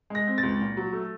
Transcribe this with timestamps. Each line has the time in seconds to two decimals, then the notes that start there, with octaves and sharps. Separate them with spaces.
0.10 G#3 A#6
0.27 C4
0.38 A6
0.43 C#2
0.61 A#2
0.77 F#3
0.93 A3